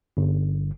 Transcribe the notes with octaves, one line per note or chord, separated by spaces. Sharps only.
G1